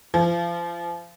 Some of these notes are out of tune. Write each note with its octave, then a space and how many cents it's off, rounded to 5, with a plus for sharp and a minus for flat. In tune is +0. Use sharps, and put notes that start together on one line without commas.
F3 -30